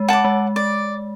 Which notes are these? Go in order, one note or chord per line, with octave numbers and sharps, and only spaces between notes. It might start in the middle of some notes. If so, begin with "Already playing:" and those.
Already playing: G#3
F#5 A5 D6
G#3
D5